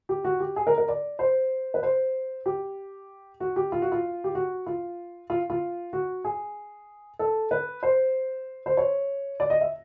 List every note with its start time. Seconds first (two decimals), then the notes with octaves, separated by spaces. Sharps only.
0.09 G4
0.24 F#4
0.40 G4
0.56 G#4
0.67 A#4
0.78 A#4
0.88 D5
1.19 C5
1.74 B4
1.83 C5
2.46 G4
3.40 F#4
3.56 G4
3.72 F4
3.82 F#4
3.92 F4
4.24 G4
4.35 F#4
4.66 F4
5.30 F4
5.50 F4
5.93 F#4
6.24 G#4
7.19 A4
7.51 B4
7.83 C5
8.66 C5
8.77 C#5
9.40 D5
9.50 D#5
9.61 E5